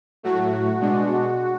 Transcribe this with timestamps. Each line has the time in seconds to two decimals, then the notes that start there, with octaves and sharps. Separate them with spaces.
0.23 A2 F#3 A3 F#4
0.80 B2 G#3 D4